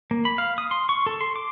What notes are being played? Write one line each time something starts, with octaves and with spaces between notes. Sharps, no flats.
A#3
B5
F5
D#6
C6
C#6
A4
C6
D6